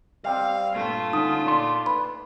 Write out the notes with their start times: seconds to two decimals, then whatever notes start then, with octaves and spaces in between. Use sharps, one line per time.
0.24 G3 C4 F5
0.74 G2 A#2 A3 F4
1.13 D3 C#4 D#4
1.46 A#2 D5 C6
1.86 B4 B5